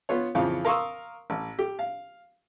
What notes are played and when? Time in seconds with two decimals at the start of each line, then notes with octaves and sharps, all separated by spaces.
0.09 B3 F4 C#5
0.35 F2 C#3 E3 F3 F5
0.65 A#4 F5 C6 C#6 D#6 E6
1.30 A1
1.59 G4
1.79 F5